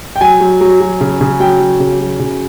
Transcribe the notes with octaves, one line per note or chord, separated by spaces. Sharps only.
G5
F#3 G#5
F#3
F#3
F#3
C#3
C#3
F#3 G5
F#3
C#3
F#3
C#3